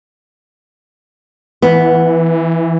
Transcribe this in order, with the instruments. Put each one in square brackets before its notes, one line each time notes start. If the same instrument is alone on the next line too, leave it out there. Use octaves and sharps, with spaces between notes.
[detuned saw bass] E3 [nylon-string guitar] B3